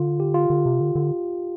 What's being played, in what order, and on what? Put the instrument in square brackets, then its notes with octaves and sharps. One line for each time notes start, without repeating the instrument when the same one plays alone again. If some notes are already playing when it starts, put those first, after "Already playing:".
Already playing: [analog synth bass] D3 [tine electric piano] F4
[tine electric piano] G4
F4
[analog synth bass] D3
C3
D3
D3